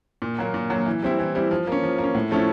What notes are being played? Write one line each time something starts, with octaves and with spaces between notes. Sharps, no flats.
A#2
F#3 A#3
A#2
F#3 A#3
E3
G3 C4 E4
E3
G3 C4 E4
F3
A#3 C#4
F3
A#3
C#4
A2
F3 A3 C#4 E4